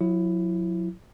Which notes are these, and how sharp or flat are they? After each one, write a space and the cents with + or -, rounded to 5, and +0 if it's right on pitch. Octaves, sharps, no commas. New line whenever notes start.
F#3 -35 E4 +10